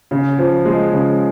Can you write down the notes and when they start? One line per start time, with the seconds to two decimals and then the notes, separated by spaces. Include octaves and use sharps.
0.11 C#3
0.38 F3
0.65 G#3
0.93 C#3